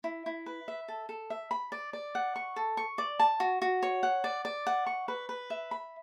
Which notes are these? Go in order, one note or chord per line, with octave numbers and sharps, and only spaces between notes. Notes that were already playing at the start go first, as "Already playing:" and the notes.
E4
E4
B4
E5
A4
A4
E5
B5
D5
D5
F#5
C#6
A4
C#6
D5
A5
F#4
F#4
C#5
F#5
D5
D5
F#5
C#6
B4
B4
E5
B5